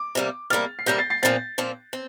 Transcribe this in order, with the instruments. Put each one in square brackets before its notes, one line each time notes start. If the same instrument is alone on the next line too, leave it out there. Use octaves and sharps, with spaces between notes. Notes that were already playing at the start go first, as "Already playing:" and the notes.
Already playing: [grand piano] D6
[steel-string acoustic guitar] C3 G3 A#3
[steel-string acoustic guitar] C3 G3 A#3 [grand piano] F6 A6
[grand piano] C7
[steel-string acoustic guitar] C3 G3 A#3 [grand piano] G6 A#6
[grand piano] A6 C7
A6 C7
[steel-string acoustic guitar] A#2 F3 C4 [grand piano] A6 C7
[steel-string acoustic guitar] A#2 F3 C4
C4